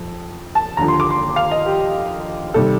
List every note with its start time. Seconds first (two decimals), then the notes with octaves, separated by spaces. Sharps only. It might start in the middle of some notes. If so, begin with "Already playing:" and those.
Already playing: F2
0.55 A5
0.77 D#2 D3 F3 A#5
0.88 C6
1.00 D6
1.10 C6
1.36 F5
1.51 D#5
1.66 G4
2.54 C3 D#3 G3 A4